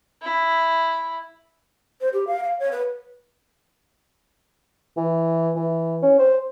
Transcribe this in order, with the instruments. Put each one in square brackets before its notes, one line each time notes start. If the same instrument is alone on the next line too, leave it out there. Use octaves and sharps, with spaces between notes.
[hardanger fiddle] E4
[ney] C5
G4
F5
F5
C#5
B4
[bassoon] E3
E3
C#4
C5